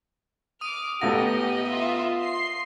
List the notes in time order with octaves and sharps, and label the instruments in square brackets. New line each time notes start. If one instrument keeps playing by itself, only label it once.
[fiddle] D6 F6 [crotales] D#6 D#7
[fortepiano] A1 A2 F#5 [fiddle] B3 D#5 [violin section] G4 [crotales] A#6
[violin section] F4 E5
C6 C7